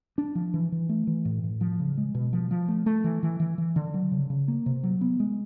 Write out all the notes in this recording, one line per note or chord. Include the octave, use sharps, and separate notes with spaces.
D4
F3
E3
E3
A3
E3
A2
A2
F3
C#3
G#3
B2
F3
F3
A3
A3
E3
E3
E3
E3
D3
F#3
C#3
C#3
A#3
C3
F#3
B3
G#3